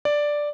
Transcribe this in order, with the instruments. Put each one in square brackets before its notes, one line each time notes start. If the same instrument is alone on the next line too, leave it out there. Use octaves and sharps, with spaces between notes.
[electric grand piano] D5